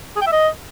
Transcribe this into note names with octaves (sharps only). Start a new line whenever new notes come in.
G#4
G5
E5
D#5